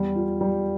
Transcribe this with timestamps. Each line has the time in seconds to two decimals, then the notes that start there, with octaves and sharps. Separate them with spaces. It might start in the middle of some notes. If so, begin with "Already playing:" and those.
Already playing: E2 G3
0.16 F4
0.41 G3